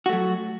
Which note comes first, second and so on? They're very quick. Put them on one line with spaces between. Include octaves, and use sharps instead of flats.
F#4 A3 F#3